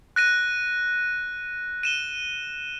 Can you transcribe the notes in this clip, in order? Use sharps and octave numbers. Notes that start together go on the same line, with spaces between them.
F#6 A#6 D#7
D#7 E7 G7